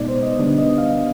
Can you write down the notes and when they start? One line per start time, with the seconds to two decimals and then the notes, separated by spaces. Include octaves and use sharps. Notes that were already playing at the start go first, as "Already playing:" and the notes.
Already playing: B2 G#3 B3 D#4 D5
0.08 C5
0.23 D#5
0.38 D3 G3 B3 D4
0.58 D#5
0.78 F5